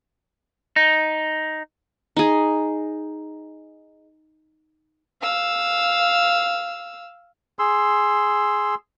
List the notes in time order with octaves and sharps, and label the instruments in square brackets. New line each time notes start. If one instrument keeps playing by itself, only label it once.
[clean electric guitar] D#4
[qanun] D#4 G#4
[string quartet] F5 E6
[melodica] G#4 C6 E6